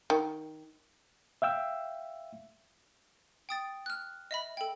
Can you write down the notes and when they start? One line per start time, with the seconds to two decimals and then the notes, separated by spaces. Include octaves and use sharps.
0.10 D#3
1.42 E5 F5 G5 E6
3.49 G5 D#6 A6
3.86 F6 F#6
4.31 D#5 E5 B5
4.57 A4 G5